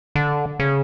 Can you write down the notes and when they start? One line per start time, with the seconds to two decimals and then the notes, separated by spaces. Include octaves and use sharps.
0.15 D3
0.59 C#3